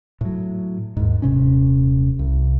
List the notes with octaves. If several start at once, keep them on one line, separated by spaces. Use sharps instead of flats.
A2 F#3
D#2 G#2
D#1 C3 C#4
C2